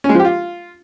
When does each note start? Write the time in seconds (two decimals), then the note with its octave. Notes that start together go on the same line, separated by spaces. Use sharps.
0.04 C#4
0.09 G#3
0.14 F3
0.20 G4
0.25 F4